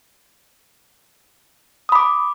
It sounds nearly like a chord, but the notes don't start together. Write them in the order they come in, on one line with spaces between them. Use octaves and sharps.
D#6 B5 D6